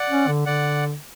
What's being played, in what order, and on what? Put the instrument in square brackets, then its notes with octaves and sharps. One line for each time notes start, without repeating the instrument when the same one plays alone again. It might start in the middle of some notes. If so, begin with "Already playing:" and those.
Already playing: [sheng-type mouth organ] D5 F#5
[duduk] C#4
D3
[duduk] D3 [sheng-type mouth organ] D5 F#5